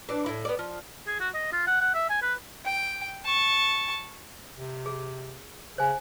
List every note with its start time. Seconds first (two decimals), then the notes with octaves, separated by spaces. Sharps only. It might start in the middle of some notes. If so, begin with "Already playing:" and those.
0.09 E3 D4
0.26 A2 E4
0.45 B3 D5
0.59 F3
1.07 G#4
1.20 F#4
1.35 D#5
1.53 F4
1.67 F#5
1.81 F#5
1.94 E5
2.10 G#5
2.22 B4
2.65 G5
3.25 A5 C#6
4.55 C3
4.86 G#4
5.78 C#3 C5 G#5